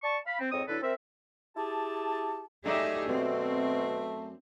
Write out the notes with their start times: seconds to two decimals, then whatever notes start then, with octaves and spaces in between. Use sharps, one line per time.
0.03 D5 A5 C#6
0.27 F5 B5
0.40 C4
0.52 F2 G#2 C4 C#5 D#5 D#6
0.68 D3 F#3 D4 E4 A4 B4
0.82 C4 A#4 E5
1.56 E4 G4 G#4 A5
2.66 F#2 A3 D#4 G4 G#4 D5 E5
3.09 B2 C4